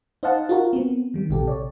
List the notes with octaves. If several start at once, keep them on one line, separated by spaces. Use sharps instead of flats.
D#4 C5 D#5 F5 F#5 A5
F4 F#4 A#4
B3 C4
D#3 G3
A#1 C3 G4 A4
C#5 D5